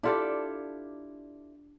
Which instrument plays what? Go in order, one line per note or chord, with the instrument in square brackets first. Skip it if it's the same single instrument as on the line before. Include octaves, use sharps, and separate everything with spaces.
[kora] D4 F4 G4 [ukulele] E4 A4 D5